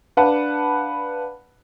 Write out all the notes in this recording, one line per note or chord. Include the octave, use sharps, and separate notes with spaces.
D4 B4 F5 F#5 A5 B5